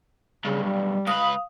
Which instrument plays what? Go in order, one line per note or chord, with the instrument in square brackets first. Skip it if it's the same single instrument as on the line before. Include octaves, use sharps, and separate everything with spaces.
[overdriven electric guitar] B1 G2 [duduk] C#3
[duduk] G3
[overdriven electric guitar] C#2 B4 [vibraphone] F5 D#6